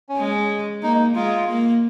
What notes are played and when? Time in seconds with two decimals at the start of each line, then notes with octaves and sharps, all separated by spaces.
0.09 C#4
0.17 G#3
0.83 A#3 D#4
1.15 G#3 F4
1.48 A#3